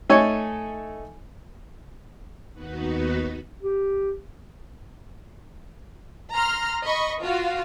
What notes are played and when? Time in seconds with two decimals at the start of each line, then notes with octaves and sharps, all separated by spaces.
0.10 A3 D#4 A4 C#5 G#5
2.53 D#2 B3 D#4 F#4 B4
3.62 G4
6.34 A#5 C6 F6
6.84 D#5 B5 C#6
7.21 F4 F#4 F5